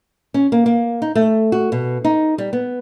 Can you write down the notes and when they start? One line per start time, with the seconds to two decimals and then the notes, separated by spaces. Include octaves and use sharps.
0.34 C#4
0.52 A#3
0.66 A#3
1.02 D#4
1.15 A3
1.52 F#4
1.72 B2
2.04 D#4
2.38 G3
2.53 B3